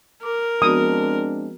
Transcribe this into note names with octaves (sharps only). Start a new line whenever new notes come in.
A#4 D6
F3 G#3 B3 C4 D4 F#4 D#6